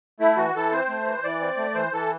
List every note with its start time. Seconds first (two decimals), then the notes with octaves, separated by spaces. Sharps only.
0.20 A3 E4
0.37 E3 F#4
0.54 E3 A4
0.72 C4 C5
0.89 A3
1.06 E3
1.24 E3 D5
1.41 C4
1.57 A3
1.75 E3 C5
1.92 E3 A4